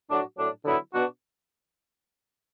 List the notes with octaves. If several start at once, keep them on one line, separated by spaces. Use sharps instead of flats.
A2 F#3 D4 F#4
A2 F#3 D4
D3 F#3 B3 E4
B2 B3 D4 F#4